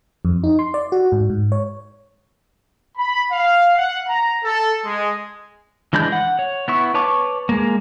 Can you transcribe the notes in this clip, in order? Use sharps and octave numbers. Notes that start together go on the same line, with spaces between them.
F2
D#4
C6
D5
F#4
G#2
G#2
C#5
B5
F5
F#5
A#5
A4
G#3
E3 G#3 D4 B5 G6
F#5
C#5
B3 E4 C#6
B4 C#5 A5 C#6 D6
G#3 A#3